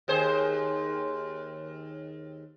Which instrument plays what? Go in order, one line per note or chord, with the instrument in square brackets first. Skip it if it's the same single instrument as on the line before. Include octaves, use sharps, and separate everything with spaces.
[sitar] D#2 G#4 C5